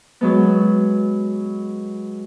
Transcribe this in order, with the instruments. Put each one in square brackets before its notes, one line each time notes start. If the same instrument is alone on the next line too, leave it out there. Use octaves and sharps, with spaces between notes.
[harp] F#3 G#3 B3